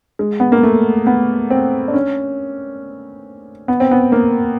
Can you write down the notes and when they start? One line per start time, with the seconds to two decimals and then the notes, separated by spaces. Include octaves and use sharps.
0.19 G#3
0.40 B3
0.52 A#3
0.63 A3
1.07 B3
1.50 C4
1.88 D4
1.94 C#4
3.68 B3
3.80 C4
3.91 B3
4.12 A#3